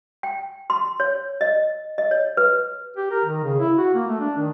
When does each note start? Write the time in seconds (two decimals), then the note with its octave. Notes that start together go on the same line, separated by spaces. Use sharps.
0.23 G5
0.70 C6
1.00 C#5
1.41 D#5
1.98 D#5
2.11 C#5
2.37 B4
2.97 G4
3.11 A#4
3.25 D#3
3.44 C#3
3.60 E4
3.77 F#4
3.95 A#3
4.08 A3
4.20 D4
4.38 D#3